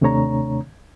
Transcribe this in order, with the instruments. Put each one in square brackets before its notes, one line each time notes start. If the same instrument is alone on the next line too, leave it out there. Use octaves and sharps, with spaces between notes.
[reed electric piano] D#2 C3 A3 D4 C#5 A#5